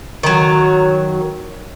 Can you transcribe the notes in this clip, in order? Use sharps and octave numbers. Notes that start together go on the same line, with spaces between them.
D#3 F#3